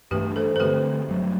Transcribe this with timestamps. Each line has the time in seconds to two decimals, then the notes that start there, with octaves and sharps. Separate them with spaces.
0.11 G2 E3 A3 D4 G4 B4
0.36 A4 C5
0.56 C5
0.60 D3 A3 C4 G4 B4
1.09 G2 F#3 A3